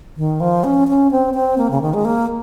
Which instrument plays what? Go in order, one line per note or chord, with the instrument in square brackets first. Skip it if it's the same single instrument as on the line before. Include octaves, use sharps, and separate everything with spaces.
[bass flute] D#3
F3
C#4
C#4
C4
C4
A#3
C#3
D#3
G#3
A#3